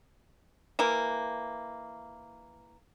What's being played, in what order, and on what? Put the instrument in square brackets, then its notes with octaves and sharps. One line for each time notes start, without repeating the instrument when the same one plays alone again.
[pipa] E3 A#3